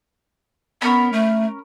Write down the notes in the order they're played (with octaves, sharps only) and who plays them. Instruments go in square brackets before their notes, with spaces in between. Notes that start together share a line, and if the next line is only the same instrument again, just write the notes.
[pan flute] B3 [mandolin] C#4 A#4 B5
[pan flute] A3